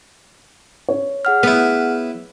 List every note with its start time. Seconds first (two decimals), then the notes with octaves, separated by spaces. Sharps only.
0.89 C#5
1.25 G#4 F#5 F6
1.43 B3 E4 B4